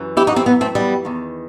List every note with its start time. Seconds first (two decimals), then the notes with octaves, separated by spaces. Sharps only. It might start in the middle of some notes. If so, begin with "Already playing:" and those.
Already playing: F#2 E3
0.17 E4 G4
0.27 D#4 F#4
0.36 C4 E4
0.46 B3 D#4
0.61 A3 C4
0.75 G3 B3
1.05 E2 D#3